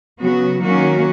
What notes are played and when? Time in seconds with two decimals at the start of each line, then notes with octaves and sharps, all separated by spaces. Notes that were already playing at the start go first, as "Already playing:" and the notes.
0.21 C#3 F#3 B3 F#4
0.62 D#3 F#3 A#3 C#4 F#4